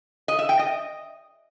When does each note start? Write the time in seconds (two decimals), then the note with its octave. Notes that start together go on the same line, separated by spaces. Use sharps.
0.28 D#5
0.39 E5
0.49 G5
0.59 D#5